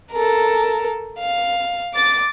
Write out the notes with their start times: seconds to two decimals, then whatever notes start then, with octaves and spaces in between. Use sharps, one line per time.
0.13 A4 A#4
1.20 F5
1.94 D6 A6